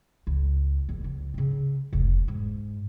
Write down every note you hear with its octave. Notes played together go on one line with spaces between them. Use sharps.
C#2
F1 D#2
C#2
C#3 C4
F1 C2
G#2